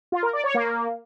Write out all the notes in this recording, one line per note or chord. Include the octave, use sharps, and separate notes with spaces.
F4
A#4
D5
C#5
A#3